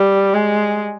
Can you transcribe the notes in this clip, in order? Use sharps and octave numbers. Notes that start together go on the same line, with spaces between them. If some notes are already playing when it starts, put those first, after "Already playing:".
Already playing: G3
G#3